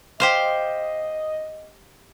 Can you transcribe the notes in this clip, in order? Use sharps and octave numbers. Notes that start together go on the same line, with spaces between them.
G4 C5 D#5 F5